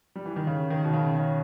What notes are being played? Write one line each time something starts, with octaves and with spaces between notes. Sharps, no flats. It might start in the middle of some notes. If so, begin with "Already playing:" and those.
G3
E3
D#3
C#3
D#3
B2
C#3
C#3